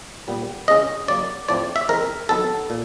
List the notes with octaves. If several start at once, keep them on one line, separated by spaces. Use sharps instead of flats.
A#2 G3 B3
C#3 E3 G#3 C#4 D#5
C#3 F#3 A#3 D5
A2 F3 A3 C4 D5
E5
E3 G#3 C4 A#4
D#3 F#3 B3 A4
A#2